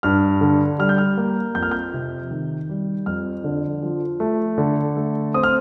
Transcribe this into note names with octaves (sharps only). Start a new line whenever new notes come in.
G2 F6
D3
G3 F6
G6
F6
A#3
F2 G6
F6
G6
C3
D#3
G3
F2 F6
D3
F3
A3
D3
A3
C4 D#6
F6